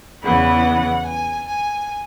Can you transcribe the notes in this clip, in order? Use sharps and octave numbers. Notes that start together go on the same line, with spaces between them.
E2 C#3 E3 B3 E4 F#5
G#5
G#5